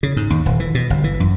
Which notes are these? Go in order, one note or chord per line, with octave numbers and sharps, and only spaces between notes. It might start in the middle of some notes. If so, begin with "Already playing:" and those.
C#3
G#2
D#2
D#1
E3
B2
G1
E3
F#2